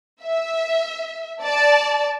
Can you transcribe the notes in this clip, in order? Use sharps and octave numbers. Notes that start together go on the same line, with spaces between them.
E5
D5 A5